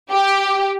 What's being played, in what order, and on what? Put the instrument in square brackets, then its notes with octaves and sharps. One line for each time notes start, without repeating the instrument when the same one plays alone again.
[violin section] G4